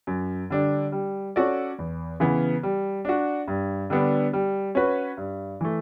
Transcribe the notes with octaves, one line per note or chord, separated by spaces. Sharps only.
F#2
D3 G3 D4
G3
C#4 F#4 A4 D5
E2
C#3 E3 B3
G3
D4 F#4
G2
D3 G3 B3 D4
G3
C#4 F#4 B4
G2
E3 A3